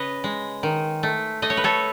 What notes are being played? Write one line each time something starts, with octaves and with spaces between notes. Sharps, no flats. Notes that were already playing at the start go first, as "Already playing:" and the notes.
Already playing: C#3 B4 C#5 D#5
G#3
D#3
A3
A3 D#5
C#5
B4
A4 C#5